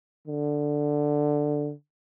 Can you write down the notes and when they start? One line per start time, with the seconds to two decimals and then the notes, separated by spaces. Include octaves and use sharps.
0.28 D3